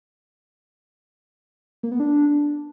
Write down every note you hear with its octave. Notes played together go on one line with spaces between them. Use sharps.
A#3
B3
D4